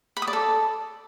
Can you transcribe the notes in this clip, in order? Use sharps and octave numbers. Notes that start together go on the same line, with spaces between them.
B5
D#6
D5
A4